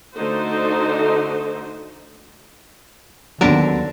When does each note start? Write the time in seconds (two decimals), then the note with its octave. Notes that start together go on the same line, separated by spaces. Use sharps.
0.15 D3 A3 D#4 F#4 C5
3.41 D#2 D3 F#3 B3 C4 D4 A#4